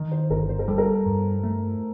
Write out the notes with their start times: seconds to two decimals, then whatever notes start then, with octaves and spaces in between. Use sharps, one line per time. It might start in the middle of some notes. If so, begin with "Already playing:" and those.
Already playing: D#3
0.12 C5
0.30 G1 A#4
0.49 C5
0.59 A#4
0.68 G3 A4
0.78 A#4
1.06 G2
1.43 A3